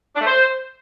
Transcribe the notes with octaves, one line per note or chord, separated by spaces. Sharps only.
D4
A3
C5